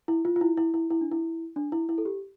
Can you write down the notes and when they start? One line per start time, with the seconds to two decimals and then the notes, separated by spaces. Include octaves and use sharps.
0.08 E4
0.25 F4
0.36 F4
0.41 E4
0.57 E4
0.74 E4
0.90 E4
1.01 D4
1.12 E4
1.56 D4
1.72 E4
1.89 E4
1.98 A4
2.05 G4